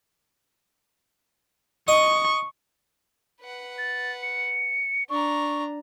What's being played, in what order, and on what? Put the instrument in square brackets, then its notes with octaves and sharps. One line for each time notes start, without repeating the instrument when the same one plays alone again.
[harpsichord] D#5 [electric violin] C#6
[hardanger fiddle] B4 F#5
[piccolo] A6
C#7
[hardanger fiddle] D4 A#5 [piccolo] C#6